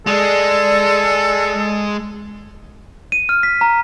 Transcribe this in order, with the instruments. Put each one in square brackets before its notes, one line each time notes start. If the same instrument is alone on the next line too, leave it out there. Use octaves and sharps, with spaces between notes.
[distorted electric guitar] G#3 G#4 [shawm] A4 [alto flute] D5
[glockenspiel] D#7
F6
B6
A#5